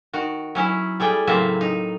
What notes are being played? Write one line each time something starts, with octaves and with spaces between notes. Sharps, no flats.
D#3 F#4
F#3 C#4 E4
G3 A3 G#4 G5
A2 C#3 F#3 A#3 C4 E5
D#4